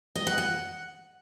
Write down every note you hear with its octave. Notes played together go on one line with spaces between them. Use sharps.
D#5
F#5
F#5